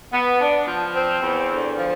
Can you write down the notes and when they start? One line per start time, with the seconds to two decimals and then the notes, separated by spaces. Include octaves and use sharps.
0.13 B3
0.40 D4
0.67 F3
0.94 C4
1.22 E2
1.49 D3
1.76 F3